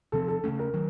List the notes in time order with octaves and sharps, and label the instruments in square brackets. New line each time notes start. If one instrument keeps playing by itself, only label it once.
[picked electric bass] C3 F3 C4 [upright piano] A4
[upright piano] A4
[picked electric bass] C#3 A3 C#4
[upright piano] A#4
[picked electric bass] D#3 F#3